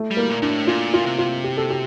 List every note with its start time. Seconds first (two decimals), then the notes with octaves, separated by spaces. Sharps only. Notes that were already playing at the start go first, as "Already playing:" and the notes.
Already playing: A3
0.11 G3
0.17 A#3
0.30 A#2
0.42 A#2 D4
0.50 A2
0.67 A#2 F4
0.94 F4
1.06 C3
1.18 F4
1.44 G4
1.57 A4
1.70 G4